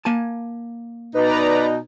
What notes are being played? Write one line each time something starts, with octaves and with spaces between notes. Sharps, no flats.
A#3 G#5 A5
B2 D#4 B4 D5 A#5